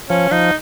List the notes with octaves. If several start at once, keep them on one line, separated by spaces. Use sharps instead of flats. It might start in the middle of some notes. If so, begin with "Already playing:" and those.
F3 C#4
F3 D#4